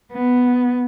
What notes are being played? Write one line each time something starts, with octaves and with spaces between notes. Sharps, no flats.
B3